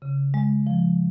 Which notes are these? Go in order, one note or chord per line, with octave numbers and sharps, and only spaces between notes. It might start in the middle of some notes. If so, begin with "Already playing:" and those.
C#3
G#3
F3